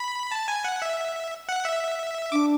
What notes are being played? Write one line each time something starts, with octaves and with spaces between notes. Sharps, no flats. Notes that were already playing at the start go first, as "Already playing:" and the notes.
Already playing: B5
A5
G#5
F#5
E5
F#5
E5
D4 D6